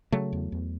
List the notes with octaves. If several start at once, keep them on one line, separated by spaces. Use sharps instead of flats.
C#3 F#3 A3
E2
E2